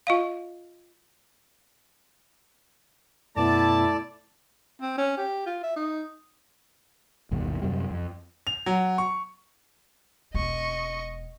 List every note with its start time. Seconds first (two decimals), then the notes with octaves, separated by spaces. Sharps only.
0.07 F4 D#5 F5
3.37 F#2 B2 A3 B3 E4 A4 D5 A5
4.81 C4
4.98 C#4
5.17 G4
5.46 F4
5.63 E5
5.76 D#4
7.31 G#1 D#2 B2 G3
7.62 F#2 C3 G3
7.91 F2
8.47 F7
8.66 F#3
8.98 C#6
10.34 E1 B3 D#5 C#6